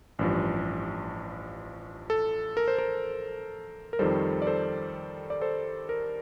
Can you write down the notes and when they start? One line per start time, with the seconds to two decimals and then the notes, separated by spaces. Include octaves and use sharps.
0.19 A1 G2 F3
2.10 A4
2.57 A#4
2.68 C5
2.78 A#4
3.93 A#4
3.99 F2 D#3 G3 A4 C5
4.42 D5
4.47 A4 C5
5.30 D5
5.41 A4 C5
5.89 A#4